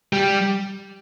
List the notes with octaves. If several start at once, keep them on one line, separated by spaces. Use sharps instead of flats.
G3